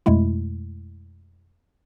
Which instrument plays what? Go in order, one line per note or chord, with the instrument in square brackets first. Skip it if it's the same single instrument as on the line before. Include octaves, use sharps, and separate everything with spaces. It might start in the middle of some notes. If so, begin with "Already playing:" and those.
[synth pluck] F2 B2 G#3 A3 E4